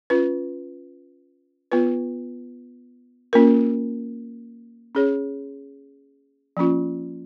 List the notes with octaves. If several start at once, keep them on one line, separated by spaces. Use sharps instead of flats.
C#4 F4 B4
B3 F4 B4
A#3 C#4 F4 A#4
C#4 G#4 C#5
F3 A#3 C#4 F4